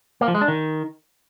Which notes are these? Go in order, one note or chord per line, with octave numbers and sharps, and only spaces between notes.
A#3
F3
G#3
D4
D#3